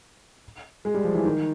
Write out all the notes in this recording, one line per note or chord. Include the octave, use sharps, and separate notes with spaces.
G#3
G3
F3
E3
D#3